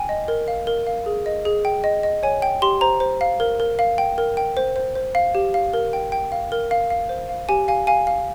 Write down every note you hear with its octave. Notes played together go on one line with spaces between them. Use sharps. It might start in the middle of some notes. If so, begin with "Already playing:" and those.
Already playing: G5 G#5
D#5
A#4
F5
A#4
F5
G#4
D#5
G#4
G5
D#5
D#5
C#5 G#5
G5
G4 C6
C5 A#5
C5
F5
A#4
A#4
F5
G5
A#4
G5
C5
C5
C5
F5
G4
F5
A#4
G5
G5
F5
A#4
F5
F5
C5
F5
G4 G#5
F5 G#5
F5 G#5
F5